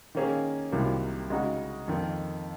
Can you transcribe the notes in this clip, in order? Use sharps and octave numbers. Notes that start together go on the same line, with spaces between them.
D#3 A#3 C#4 G#4
C2 C3 D#3 F#3 A#3
C#3 G#3 D#4 F#4
F2 D#3 A#3